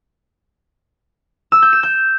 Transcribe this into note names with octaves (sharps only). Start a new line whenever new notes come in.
E6
G6
E7
G6